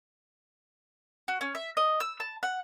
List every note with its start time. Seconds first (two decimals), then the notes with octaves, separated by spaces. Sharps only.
1.28 F#4
1.41 C#4
1.55 E5
1.77 D#5
2.00 E6
2.20 A5
2.43 F#5